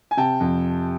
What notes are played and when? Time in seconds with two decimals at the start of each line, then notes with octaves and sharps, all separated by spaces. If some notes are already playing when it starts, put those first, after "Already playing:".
0.11 G#5
0.17 C3 G5 A5
0.40 F2